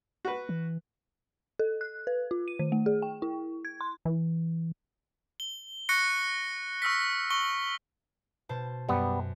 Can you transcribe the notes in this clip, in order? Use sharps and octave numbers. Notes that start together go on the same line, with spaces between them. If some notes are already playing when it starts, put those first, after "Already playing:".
F#4 B4
E3
A4
F#6
B4
F4
D#7
D#3
A3
G#4
G5
E4
G#6
C6
E3
G7
C#6 F#6 A#6 C#7
C#6 E6 F6 B6
C#6 G7
B2 C5 A5
F#2 G3 B3